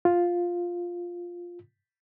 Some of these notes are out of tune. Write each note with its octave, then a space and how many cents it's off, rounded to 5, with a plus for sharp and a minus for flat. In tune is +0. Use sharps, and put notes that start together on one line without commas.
F4 +5